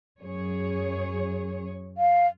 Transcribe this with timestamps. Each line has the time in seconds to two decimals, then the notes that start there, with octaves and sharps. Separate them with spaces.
0.20 F#2 G#4 C#5
1.98 F5